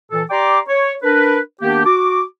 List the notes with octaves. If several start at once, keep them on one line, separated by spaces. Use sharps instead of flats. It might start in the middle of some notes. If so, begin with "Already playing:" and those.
A#2 E3 A4
G4 D5 G5 A#5 C6 D6
C#5
D4 A#4 B4
D#3 A#3 B3 D4 G4
F#4 D6